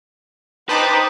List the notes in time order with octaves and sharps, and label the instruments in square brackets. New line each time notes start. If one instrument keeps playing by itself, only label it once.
[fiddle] D#4 [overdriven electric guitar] B4 [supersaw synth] C5 A5 D6 [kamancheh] G5 D#6